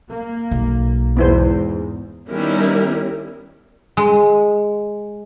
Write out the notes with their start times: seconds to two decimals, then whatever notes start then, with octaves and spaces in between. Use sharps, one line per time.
0.10 A#3
0.51 B1
1.17 E2 G#2 B3 E4 C5
2.30 D#3 G3 B3 C#4 E4 A#4
3.97 G#3